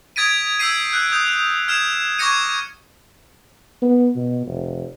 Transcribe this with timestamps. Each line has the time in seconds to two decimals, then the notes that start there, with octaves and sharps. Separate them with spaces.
0.16 D#6 G#6 A6 B6 D7 D#7
0.59 E6 G6 G#6 B6 C7 D#7
0.93 F#6 G6 D7
1.12 D#6 G6
1.68 F6 G#6 C7 E7
2.18 C#6 D6 G#6 A#6 C#7 D#7
3.82 B3
4.16 B2
4.47 F1